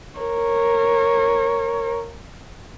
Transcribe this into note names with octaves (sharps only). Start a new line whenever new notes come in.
A#4 C#5